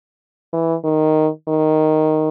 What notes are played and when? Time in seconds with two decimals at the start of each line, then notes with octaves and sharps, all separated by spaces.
0.53 E3
0.84 D#3
1.48 D#3